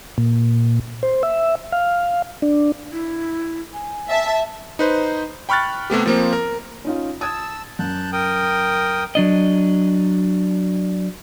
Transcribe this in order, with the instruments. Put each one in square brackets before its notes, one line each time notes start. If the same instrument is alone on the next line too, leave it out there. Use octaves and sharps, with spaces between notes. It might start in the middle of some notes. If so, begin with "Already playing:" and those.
[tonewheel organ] A#2
C5
E5
F5
D4
[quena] E4
G#5
[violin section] E5 A5
[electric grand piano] D#4 B4 C5
G5 B5 C#6 F6 F#6 A6
C3 A3 B3 G4
F3 A#3 C4
A#4
[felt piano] C#4 D#4 F4
[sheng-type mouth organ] A5 E6 [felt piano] D#6 G#6
[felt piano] F#2 [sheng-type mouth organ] A5 F#6 G6
[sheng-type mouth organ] A#4 G5 D#6
[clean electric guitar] F#3 D4 D#5